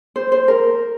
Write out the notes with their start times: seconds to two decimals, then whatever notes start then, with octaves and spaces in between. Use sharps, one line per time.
0.16 C5
0.32 C5
0.48 A#4